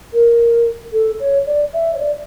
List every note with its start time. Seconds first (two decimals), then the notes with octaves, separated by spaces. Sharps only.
0.13 A#4
0.93 A4
1.20 C#5
1.46 D5
1.73 E5
1.95 C#5
1.99 D5